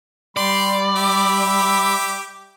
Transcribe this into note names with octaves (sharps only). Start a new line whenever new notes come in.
G3 G4 D5 B5 C6
G4 E5 D6